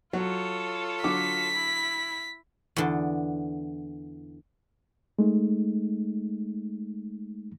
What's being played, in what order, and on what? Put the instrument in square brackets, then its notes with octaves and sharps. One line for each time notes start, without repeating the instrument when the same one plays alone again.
[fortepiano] F#3 [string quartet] F4 A4 C#5
[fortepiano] D3 F#3 D6 [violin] B6
[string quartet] E4
[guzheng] E2 D3
[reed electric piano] G#3 A3 D#4